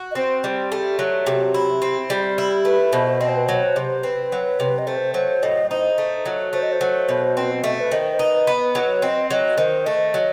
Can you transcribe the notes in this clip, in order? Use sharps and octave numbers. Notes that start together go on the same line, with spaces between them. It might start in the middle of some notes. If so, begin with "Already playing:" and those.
Already playing: F#4
D#5
C4 C5
G3
A3
F#3
C3
E4
C4
G3
E4
A3 B4
B2 C5
C4 D#5
C5
B4
F#3 C5
C3
C4 B4
F#3
C3
D#5
A3 C5
F#3 C5
A2 D#5
D#4 C5
A3
F#3
A3 C5
D#5
C5
F#3
B2
C4 B4
A3 D#5
B4
D#3 C5
C5
D#4 B4
B3
F#3
C4 D#5
F#3 D#5
D#3 C5
A3 D#5
F#3